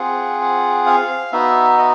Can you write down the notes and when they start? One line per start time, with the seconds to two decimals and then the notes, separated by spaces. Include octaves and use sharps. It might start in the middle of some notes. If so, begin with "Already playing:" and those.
Already playing: C4 F4 G#4 F#5
0.41 F#5
0.86 F5
1.32 B3 D#4 F#4 E5
1.78 D#5